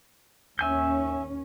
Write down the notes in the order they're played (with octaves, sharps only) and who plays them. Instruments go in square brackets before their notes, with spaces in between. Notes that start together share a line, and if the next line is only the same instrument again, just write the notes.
[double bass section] D#2 C#4 [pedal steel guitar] E5 G#5 G6